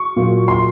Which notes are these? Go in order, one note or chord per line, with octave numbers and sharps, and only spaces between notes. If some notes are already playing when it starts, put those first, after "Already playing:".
Already playing: C#6
A#2 F#3 A#3
C6